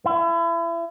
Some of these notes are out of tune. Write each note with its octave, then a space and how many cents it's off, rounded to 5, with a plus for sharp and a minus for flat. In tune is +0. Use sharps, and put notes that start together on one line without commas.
E4 +35